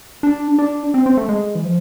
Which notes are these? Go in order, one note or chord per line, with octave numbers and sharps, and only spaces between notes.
D4
D4
C4
C4
A3
G#3
E3
F3